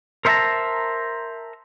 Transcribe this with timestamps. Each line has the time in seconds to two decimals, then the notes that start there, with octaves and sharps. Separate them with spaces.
0.25 A#4 C5 E5 F5 A5 A#5